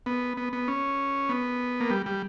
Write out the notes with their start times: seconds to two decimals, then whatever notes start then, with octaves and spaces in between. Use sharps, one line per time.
0.06 B3
0.37 B3
0.53 B3
0.68 C#4
1.29 B3
1.80 A#3
1.90 G3
2.06 G3